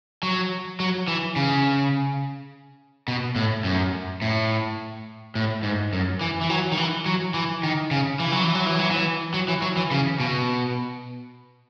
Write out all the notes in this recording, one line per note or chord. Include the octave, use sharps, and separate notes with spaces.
F#3
F#3
E3
C#3
B2
A2
F#2
A2
A2
G#2
F#2
E3
E3
F#3
D#3
E3
F#3
E3
D#3
C#3
E3
F#3
E3
F#3
E3
F#3
E3
F#3
E3
F#3
E3
C#3
B2